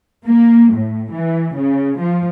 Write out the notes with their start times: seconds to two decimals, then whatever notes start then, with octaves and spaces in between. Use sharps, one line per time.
0.25 A#3
0.73 A2
1.12 E3
1.56 C#3
2.00 F3